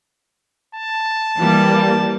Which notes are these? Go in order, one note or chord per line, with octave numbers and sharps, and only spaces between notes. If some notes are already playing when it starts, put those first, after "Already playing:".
A5
E3 G3 A#3